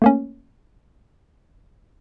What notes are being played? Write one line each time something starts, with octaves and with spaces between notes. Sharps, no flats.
A3 A#3 C#4